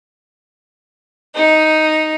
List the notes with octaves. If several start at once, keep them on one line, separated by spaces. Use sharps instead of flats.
D#4